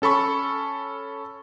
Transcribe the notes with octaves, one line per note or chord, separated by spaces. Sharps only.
C#4 A4 B5 C#6